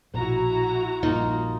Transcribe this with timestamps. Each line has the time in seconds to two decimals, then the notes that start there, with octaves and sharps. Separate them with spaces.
0.14 A#1 B2 E4 F#4 A#5
1.03 A#1 G2 A#3 D#4 F4